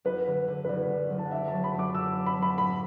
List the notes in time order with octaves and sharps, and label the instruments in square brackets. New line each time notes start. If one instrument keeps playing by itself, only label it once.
[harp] F#1 [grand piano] B4
[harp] D3
D3
[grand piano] B4
[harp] F#1 [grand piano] D5
[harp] F#1
F#1
[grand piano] A5
F#5
[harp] D4 [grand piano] E5
[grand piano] A5
[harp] F#3
[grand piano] B5
[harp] F#2
[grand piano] D6
[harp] F#1 [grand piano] E6
[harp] D4
[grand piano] B5
[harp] F#3 [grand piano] B5
[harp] A2 [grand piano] B5